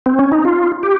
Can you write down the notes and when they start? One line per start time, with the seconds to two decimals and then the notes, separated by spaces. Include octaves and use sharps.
0.06 C4
0.19 C#4
0.32 D#4
0.45 F4
0.83 G4